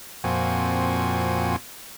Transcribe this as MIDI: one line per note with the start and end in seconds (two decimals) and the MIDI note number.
0.24 1.56 41
0.24 1.56 46
0.24 1.56 60
0.24 1.56 66
0.24 1.56 80